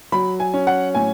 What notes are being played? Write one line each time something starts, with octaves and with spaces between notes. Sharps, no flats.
F#3 B5
G#5
C#4
F#5
A2 G#5